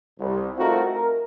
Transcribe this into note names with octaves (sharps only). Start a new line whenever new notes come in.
C2
A3 C4 D#4 F4 F#4 A#4
A#4